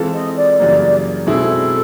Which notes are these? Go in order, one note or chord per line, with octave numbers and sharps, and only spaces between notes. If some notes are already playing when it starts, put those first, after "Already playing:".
Already playing: E3 G#3 C4 F4 A4
D#5
D5
F#2 C#3 E3 G3 A#3
B2 G#3 C4 E4 G#4 A4